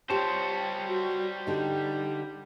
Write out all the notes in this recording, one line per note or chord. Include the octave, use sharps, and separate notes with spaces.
G3 F4 G4 C5 C#5 A5
F#4
D3 D#4 G4